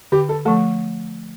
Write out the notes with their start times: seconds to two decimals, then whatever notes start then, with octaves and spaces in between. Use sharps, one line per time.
0.12 D3 G4
0.29 A4
0.45 F3 A3 A4